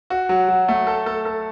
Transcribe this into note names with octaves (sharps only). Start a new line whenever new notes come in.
F#4
F#3
F#3
A3
A4
A4
A4